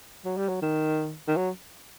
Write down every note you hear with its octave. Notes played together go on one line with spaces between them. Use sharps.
F#3
G3
F#3
D#3
D#3
F#3